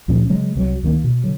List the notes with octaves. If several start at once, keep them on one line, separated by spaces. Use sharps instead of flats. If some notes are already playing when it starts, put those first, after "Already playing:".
D2 A#2 F3 C#4
C#3 F#3 G#3
C2 F3 F#3
D2 D#3 F#3 A#3
B2
D3 F#3